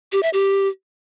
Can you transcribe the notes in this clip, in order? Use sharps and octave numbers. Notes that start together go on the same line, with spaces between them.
G4
E5
G4